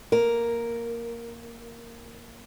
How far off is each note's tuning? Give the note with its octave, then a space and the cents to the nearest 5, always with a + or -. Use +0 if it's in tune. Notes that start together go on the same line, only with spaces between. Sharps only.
A#3 +0 A#4 +0